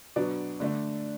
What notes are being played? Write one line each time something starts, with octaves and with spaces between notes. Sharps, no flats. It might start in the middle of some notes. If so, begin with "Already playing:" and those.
B2 F#3 B3 D4 D5
D3 A3 D4